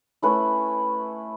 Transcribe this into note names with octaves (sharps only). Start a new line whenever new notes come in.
A3 C#4 E4 B4